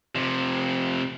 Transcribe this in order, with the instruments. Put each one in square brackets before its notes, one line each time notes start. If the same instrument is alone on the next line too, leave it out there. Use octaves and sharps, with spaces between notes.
[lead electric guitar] C3 F3